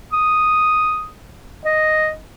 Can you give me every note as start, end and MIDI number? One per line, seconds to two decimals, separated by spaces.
0.13 1.09 87
1.65 2.13 75